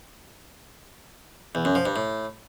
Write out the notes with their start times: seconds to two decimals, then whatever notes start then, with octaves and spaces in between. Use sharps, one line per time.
1.55 E2
1.65 F#2
1.75 F3
1.86 G2
1.96 A2